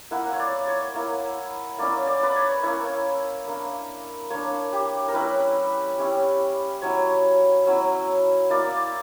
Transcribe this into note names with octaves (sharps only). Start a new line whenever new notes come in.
A#3 E4 F#5
C#5
D5
C#5
A#3 E4
A#3 C#4 E4 D5
D5
B4
C#5
A#3 C#4 E4 C#5
A#3 D4
A#3 D4 C#5
G4
A#4
G3 C#4 E4 B4
G3 C#4 E4
F#3 C#4 E4 C#5
F#3 C#4 E4
A#3 E4 D5